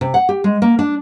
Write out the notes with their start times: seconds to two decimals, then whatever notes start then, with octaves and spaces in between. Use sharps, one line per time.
0.01 C3
0.14 F#5
0.29 G4
0.44 G#3
0.62 A#3
0.79 D4